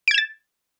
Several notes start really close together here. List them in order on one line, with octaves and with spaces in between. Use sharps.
D7 G#6 E7 A6